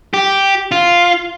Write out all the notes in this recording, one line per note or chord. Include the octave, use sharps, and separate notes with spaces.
G4
F4